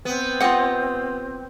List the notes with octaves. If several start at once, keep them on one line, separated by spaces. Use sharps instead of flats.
B3 C4
F4 G4 D#5 F#5